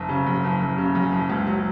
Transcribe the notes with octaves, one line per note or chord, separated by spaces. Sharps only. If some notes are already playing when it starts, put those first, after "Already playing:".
Already playing: F#1
C#3
F#2
F#1
F#1
C#3
F#2
F#1
C#2
F#3